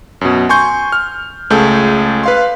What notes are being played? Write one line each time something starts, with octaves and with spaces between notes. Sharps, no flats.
F#2 B2
G#5 C6 C#6 G6
F6
C#2 A3 G#4 A4 G6
B4 F5 C6